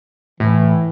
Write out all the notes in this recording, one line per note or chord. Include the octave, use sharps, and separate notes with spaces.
A2 E3